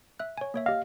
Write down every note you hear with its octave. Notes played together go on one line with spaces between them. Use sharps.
E5 F#6
C#5 G#5
A#3 C#5 E5
G4 D#5 F5